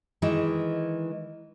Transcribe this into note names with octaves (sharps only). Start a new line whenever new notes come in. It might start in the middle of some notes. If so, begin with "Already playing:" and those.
D#3 E3 G#3 E4